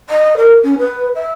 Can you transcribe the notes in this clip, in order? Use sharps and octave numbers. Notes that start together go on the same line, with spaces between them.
D#5
A#4
C#4
B4
E5